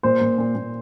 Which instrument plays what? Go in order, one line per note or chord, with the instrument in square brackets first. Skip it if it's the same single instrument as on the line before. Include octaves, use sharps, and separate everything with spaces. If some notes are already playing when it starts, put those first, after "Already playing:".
[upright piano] A#2 C5
A#2
A#2
A#2